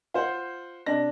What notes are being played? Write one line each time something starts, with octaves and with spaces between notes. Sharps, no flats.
F4 C5 F#5
C3 D4 A#6